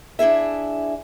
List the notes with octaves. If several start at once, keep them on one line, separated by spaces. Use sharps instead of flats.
D4 E4 G#4 E5